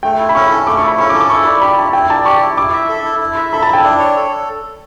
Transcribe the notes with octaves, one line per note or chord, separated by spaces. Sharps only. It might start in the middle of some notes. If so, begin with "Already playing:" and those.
A3 G5
E4
B5
C#4 C#6
B5
A4
C#6
A3 D6
C#6
E4 B5
C#4 C#6
D6
A4
D6
E4 C#6
D5 B5
G4 B5
E4 A5
E4 G5
D5 A5
G4 C#6
E4
E4 D6
E5
A4
E4
E4
E5
A4 B5
A5
E4
G5
D4
C#5
A4